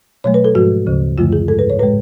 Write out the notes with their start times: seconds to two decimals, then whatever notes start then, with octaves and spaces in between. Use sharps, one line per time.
0.24 B2 F#3 A3 C#5
0.34 B4
0.45 A4
0.55 G#2 F3 G#3 F#4
0.87 D2 C#3 F3
1.18 F#2 D3 F3 A3 F4
1.33 G#4
1.48 G#2 G#3 A4
1.59 B4
1.70 C#5
1.79 A2 G#3 B4